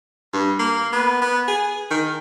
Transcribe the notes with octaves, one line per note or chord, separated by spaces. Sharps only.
G2
A#3
B3
B3
G#4
D#3